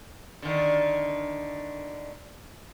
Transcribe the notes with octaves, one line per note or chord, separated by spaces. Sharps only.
D3 D#3